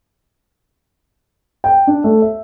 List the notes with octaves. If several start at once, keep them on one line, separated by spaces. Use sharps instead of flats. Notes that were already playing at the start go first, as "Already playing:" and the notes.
G5
D4
A3
E5